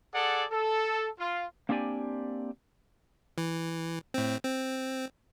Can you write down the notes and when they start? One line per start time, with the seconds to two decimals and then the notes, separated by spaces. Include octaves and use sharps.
0.13 G#4 A4 D5 F#5
0.51 A4
1.19 F4
1.69 A#3 C4 D4 G4 D5 G#5
3.38 E3
4.14 A2 C4
4.44 C4